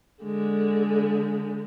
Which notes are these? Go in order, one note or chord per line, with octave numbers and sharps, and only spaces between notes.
D3 G#3